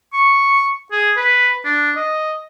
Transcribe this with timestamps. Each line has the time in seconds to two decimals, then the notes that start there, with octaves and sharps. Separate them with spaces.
0.14 C#6
0.92 G#4
1.17 B4
1.65 D4
1.97 D#5